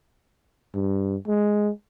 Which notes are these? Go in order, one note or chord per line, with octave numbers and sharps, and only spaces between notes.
G2
G#3